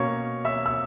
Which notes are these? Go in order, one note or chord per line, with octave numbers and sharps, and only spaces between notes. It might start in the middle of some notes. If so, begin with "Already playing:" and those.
Already playing: B2 A#3 C#4 C#5 C#6
E5 E6
E6